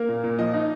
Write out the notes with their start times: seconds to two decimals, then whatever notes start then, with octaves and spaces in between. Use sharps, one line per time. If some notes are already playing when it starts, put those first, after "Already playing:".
Already playing: A#3 A#4
0.09 A#2
0.24 A#2
0.39 F3 D#5
0.54 D#4